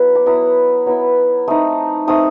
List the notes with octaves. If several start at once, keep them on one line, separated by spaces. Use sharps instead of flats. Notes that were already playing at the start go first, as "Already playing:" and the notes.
Already playing: F#3 B3 E4
D6
F#3 B3 E4 D#6
F#3 B3 E4
A3 C4 D#4 D#6
A3 C4 D#4 D#6